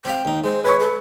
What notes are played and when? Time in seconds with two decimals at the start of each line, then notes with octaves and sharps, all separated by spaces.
0.05 C4 F5 G5
0.25 D#2 D#4
0.44 G#3 C5
0.64 B4 C#5 C#6
0.80 A4